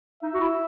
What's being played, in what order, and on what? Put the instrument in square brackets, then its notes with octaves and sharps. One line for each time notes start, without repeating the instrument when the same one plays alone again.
[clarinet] D#4 [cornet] E5
[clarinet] F#4
E4